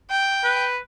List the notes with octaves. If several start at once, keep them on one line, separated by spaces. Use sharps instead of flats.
G5
B4